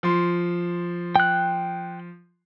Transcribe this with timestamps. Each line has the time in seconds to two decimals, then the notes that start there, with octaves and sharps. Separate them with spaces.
0.03 F3 C6
1.16 G5 F#6